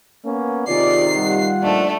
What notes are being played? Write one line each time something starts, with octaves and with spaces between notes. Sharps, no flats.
A#3 B3 C#4
C3 D#3 D#4 F4 G#4 D5 C7
G3 F4 F#5
A#2 F3 A3 D4 D#4